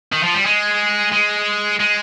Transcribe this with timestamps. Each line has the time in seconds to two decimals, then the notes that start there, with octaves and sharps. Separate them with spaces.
0.13 D#3
0.23 F3
0.34 G3
0.46 G#3
1.13 G#3
1.80 G#3